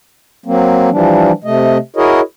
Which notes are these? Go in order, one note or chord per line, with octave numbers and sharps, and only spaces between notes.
F#3 A#3 C4
E3 F3 G3 D4
C3 A3 D#5
E4 F#4 G#4 A#4 C#5 D#5